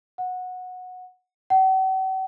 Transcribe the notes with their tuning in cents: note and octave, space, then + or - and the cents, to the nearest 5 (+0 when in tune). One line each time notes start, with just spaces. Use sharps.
F#5 -15
F#5 +45